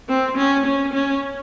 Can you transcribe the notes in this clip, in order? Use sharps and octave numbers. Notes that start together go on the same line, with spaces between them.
C4
C#4
C#4
C#4